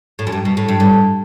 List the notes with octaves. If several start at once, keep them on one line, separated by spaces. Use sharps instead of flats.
A2
F#2
G2
B2
A2
G2
A2